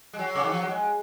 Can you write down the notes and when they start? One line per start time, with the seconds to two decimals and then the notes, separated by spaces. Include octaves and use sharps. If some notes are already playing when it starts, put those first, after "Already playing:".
0.13 G#3
0.19 F#3
0.35 C#3
0.44 D#3
0.52 F3
0.61 F#3
0.68 G#3